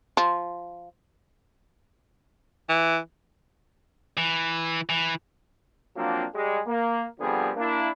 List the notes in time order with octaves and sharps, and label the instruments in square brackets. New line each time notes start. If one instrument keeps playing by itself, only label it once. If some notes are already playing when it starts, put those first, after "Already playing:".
[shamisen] F3
[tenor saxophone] E3
[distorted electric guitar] E3
E3
[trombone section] F3 F#3 A#3 C4 D4
G3 G#3 G#4
A#3
D3 F3 G3 B3 C4 G#4
A#3 D4 E4